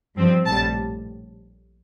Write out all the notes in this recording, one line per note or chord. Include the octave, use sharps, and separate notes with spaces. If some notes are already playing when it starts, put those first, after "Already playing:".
G2 F3 C4
A#1 A2 G3 A5